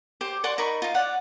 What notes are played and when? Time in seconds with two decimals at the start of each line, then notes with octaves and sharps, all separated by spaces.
0.21 G4 C5
0.44 D5 F#5 C6 C#6
0.58 D#4 A#4 B5 C#6
0.82 D#4 F4
0.94 C#5 D5 F#5